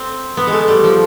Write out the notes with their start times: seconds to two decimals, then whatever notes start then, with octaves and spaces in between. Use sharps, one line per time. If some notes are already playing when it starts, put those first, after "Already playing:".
Already playing: C4
0.37 B3
0.47 G#3
0.53 A3
0.68 G3
0.84 F3